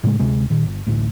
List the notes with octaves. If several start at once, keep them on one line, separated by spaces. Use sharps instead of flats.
A2 C#3 G3 G#3
D2 C3 G#3
A#2 D#3
G1
A1 D2 A2